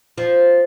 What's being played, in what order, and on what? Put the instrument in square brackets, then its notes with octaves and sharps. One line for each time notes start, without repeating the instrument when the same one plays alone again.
[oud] F3